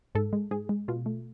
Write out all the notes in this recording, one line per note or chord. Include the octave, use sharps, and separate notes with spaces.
G#2 A4
G#3
G#2 G#4
G#3
B2 F4
A3